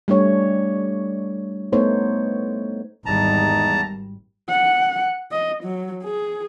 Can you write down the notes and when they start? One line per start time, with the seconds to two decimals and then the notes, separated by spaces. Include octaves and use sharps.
0.08 G3 A3 D4 C#5
1.73 A3 B3 D#4 C5 C#5
3.06 G#1 E2 G3 D#4 A5 A#5
4.49 F#5
5.31 D#5
5.63 F#3
6.04 G#4